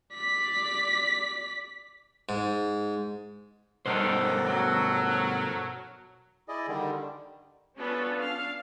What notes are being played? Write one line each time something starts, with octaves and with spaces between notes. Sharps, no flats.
D5 B6
G#2
G2 B2 D3 D#3 A4 A#4 C5 F#5
F#3
E4 G#4 D5 D#5
D3 D#3 G3
B3 C#4 D4 F4 A4 B4
D4 F5